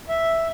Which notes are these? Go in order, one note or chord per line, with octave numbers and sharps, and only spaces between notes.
E5